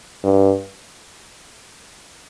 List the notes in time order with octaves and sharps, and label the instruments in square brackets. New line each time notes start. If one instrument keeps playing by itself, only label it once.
[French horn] G2